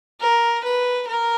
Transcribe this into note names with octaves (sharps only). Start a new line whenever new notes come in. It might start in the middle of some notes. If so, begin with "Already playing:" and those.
A#4
B4
A#4